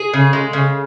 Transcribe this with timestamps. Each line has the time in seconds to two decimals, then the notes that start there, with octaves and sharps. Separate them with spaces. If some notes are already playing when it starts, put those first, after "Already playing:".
Already playing: G#4
0.13 C#3
0.33 G#3
0.53 C#3